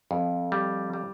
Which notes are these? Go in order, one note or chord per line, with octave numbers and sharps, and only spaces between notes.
F2
G3
G3